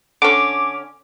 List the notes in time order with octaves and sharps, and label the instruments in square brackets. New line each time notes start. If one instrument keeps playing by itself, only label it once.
[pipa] D3 C#4 [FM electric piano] D6